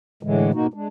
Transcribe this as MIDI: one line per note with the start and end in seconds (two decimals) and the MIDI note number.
0.23 0.51 45
0.23 0.51 50
0.23 0.51 52
0.23 0.51 56
0.54 0.67 44
0.54 0.67 47
0.54 0.67 58
0.54 0.67 63
0.54 0.67 66
0.74 0.88 56
0.74 0.88 62